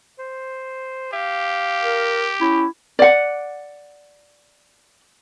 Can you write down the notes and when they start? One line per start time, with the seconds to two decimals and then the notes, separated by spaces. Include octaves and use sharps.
0.19 C5
1.13 G4 F5
1.82 A#4
2.41 C#4 E4
2.99 D5 F#5